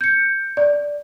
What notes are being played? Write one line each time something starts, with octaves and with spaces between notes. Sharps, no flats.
G6 C#7
D5